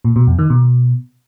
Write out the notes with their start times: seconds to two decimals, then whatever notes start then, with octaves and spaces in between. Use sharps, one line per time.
0.04 A#2
0.16 B2
0.27 F2
0.39 D#3
0.50 B2